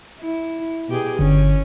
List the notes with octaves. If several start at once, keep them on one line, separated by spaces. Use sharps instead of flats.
E4
B2 G4 G#4
G1 D3 C#4